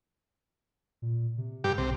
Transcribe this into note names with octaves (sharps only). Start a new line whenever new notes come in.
A#2
C3
G2 G4
B1 C3